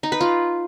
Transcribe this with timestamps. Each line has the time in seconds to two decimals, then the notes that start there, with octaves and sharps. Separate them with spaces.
0.03 D#4
0.12 B4
0.21 F4